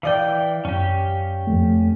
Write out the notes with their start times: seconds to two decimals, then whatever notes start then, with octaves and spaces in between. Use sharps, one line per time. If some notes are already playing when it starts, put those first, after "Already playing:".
0.03 E3 D5 F5 G5
0.65 F#2 C#4 G4
1.47 F2 A3